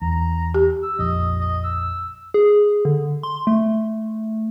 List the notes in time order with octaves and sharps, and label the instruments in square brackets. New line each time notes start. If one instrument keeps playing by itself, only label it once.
[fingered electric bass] E2 [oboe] A#5
[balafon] G4
[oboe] E6
[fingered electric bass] A#1 F2 [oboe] D#5
[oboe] D#5
E6
[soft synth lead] G#4
D3
C6
A3